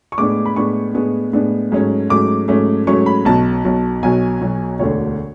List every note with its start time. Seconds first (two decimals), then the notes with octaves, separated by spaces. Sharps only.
0.12 C#6
0.18 A2 G#3 B3 D4 D6
0.46 B5
0.55 A2 G#3 B3 D4 C#6
0.94 A2 G#3 B3 D4
1.33 A2 G#3 B3 D4
1.72 G#2 F#3 A3 C#4
2.09 G#2 F#3 A3 C#4 D6
2.48 G#2 F#3 A3 C#4
2.87 G#2 F#3 A3 C#4 C#6
3.06 B5
3.25 B1 B2 F#3 A5
3.65 B1 B2 F#3
4.03 B1 B2 F#3 G#5
4.41 B1 B2 F#3
4.79 E1 D2 D3 C#5